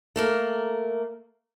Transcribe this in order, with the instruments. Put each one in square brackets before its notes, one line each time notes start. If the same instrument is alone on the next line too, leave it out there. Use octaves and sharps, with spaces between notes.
[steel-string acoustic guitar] A3 A#3 A#4